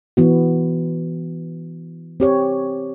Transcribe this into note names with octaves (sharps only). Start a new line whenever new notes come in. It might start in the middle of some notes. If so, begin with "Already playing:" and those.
E3 B3 F#4
C4 G4 C#5